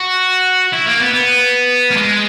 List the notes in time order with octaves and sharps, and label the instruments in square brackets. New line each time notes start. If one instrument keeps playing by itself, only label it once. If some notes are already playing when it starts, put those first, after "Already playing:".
Already playing: [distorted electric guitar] F#4
E4
A#3
B3
B3
A#3
G#3